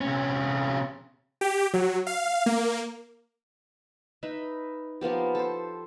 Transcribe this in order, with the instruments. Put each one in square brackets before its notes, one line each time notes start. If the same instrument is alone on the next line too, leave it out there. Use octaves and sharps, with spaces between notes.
[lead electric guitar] C3 C#4
[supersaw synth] G4
F#3
F5
A#3
[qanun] D#4 B4 E5
F3 A#3 B3 G4
A4 C5